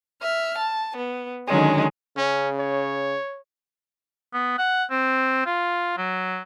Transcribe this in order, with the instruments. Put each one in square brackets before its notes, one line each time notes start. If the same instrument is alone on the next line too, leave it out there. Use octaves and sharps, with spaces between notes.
[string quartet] E5 F6
A5
B3
D3 D#3 F#3 G#3 C#4
[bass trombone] C#3 [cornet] C#4
[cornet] C#5
[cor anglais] B3
F#5
C4
F4
F#3